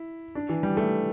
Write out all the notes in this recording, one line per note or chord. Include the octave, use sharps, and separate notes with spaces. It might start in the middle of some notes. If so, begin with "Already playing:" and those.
Already playing: E4
D4
E3
G3
A3